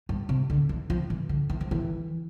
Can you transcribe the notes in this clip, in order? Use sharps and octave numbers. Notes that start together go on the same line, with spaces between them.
G2
C3
D3
E3
F3
E3
D3
E3
F3
E3